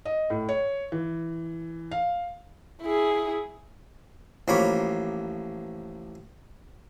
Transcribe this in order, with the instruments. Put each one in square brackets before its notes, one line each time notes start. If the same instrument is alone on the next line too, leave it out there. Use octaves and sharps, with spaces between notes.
[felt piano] D#5
A2
C#5
E3
F5
[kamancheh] E4 G#4
[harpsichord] A1 F3 A#3 C#5 B5 D6